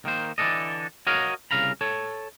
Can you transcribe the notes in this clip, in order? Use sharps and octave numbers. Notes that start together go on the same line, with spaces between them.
D#3 A#3 C5
D3 E3 D4 A4 D#5
F#4 A#4 C#5 D#5 F5
C2 C#3 F5 A#5 B5
A4 C#5